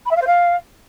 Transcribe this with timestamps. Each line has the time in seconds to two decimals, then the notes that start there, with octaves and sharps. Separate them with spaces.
0.05 B5
0.10 E5
0.16 F5
0.21 C5
0.26 F5